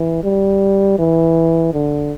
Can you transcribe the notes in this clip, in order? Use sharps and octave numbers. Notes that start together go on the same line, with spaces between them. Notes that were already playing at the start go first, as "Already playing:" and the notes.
Already playing: E3
G3
E3
D3